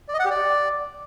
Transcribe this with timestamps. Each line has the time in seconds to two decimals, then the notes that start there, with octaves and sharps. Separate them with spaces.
0.08 D5
0.14 D#5
0.19 F#5
0.25 G4
0.31 D5